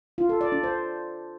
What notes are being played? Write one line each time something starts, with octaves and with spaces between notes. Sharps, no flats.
F4
A4
D5
D4
C5